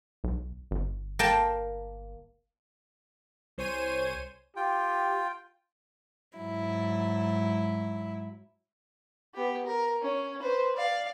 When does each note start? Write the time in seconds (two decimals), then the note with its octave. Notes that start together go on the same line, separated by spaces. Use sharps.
0.24 B1
0.71 G1
1.19 A#3 G5 A5
3.58 C2 C5 C#5 G#5 D#7
4.56 F4 G4 G5
6.37 G#2 F#3 E4
9.35 B3 G4
9.66 A#4
10.02 C#4
10.41 B4 C5
10.76 D5 F5